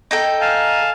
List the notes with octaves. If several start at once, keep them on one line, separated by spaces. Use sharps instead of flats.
D#4 A4 G5
F5 G#5 A5